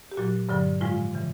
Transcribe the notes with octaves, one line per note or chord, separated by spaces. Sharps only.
G4
A#2 F#3 F#4
G2 D3 F#3
A2 F3 G#3 F4
C#3 E3